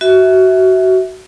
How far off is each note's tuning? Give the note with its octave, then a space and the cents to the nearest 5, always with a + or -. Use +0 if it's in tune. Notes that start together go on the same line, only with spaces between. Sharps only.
F#4 +20 E5 -15